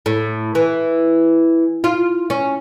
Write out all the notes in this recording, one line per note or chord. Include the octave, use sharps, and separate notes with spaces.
A2
E3
F4
C#4